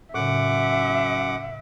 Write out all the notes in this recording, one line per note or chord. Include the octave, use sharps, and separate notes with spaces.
F#2 A2 C#3 E5 F#5 D6